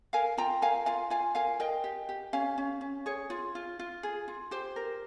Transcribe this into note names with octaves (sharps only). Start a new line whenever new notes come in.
A#4 F5 G#5
F4 G5 A#5
A#4 F5 G#5
F4 F5 G#5
F4 F5 G#5
A#4 F5 G#5
A#4 D#5 G5
G4
G4
C#4 F5 G#5
C#4
C#4
G#4 C#5
F4
F4
F4
G#4
F4
G4 C5
A#4